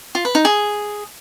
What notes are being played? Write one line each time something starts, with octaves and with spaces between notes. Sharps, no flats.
F4
B4
D#4
G#4